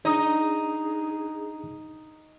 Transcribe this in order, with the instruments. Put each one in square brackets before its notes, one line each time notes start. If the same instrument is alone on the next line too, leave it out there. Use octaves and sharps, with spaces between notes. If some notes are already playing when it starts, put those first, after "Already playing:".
[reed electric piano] D4 A#5 D#6 [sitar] D#4 [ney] G#4